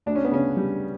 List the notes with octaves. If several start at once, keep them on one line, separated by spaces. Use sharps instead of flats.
D2 D4
C#4
B3
C#3 C#4
G3